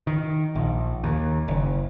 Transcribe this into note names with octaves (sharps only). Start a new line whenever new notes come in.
D#3
A#1
D#2
F#1